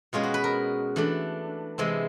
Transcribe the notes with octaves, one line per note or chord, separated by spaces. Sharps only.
B2 G#3 C#4 F4
F#4
B4
A#4
E3 A3 D4
C3 E3 G#3 C4